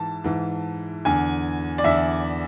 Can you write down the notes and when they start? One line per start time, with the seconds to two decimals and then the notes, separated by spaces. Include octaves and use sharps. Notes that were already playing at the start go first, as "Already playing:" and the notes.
Already playing: G#2 E3 A5
0.24 G#2 E3
1.05 E2 D3 G#5
1.78 D5
1.84 E2 D3 E5